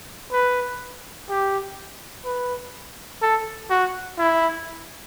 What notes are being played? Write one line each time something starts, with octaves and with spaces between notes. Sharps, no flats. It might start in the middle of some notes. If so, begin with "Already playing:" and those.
B4
G4
B4
A4
F#4
E4